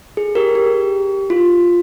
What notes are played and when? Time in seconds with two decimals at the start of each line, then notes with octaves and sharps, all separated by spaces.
0.17 G#4
0.35 G4 A#4
0.55 G4
1.30 F4